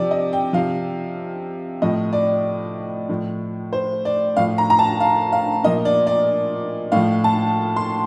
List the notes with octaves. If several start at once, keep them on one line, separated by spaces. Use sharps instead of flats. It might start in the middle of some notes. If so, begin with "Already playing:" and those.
Already playing: C3 F3 D5
D#5
G5
C3 F3 F5
A2 F3 D#5
D5
A2 F3
C5
D5
A2 F3 F5
A#5
A#5
A5
F5
F5
A#2 F3 D#5
D5
D5
A2 F3 F5
A5
C6